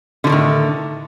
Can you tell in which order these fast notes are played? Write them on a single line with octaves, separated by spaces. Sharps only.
D3 F3 D#3 A2